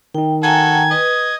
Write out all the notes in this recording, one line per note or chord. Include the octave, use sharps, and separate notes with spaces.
D#3 D#4 G5
F#4 A4 G5 G#5 A#5 G#6
B4 D#5